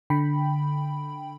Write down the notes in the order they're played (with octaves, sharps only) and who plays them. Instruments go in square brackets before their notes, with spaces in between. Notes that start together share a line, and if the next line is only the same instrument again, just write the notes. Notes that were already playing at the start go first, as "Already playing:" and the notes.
[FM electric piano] D3 G5 B5